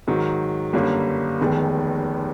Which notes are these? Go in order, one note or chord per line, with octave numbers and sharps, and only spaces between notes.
G#2 D#3 F#3
G1 F#2 D3 G3 A#3
F1 D#2 D#3 G#3 B3